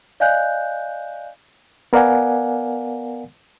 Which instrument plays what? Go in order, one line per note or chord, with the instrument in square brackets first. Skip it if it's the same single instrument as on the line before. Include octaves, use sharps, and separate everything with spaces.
[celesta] D5 D#5 F5 G#5 F#6 G6
[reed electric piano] B3 A#4 D5 F5 F#5 G#5